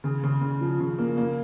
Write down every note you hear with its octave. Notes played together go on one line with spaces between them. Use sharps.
C#3
C#3
C#3
F3
C#3
A#3
A#3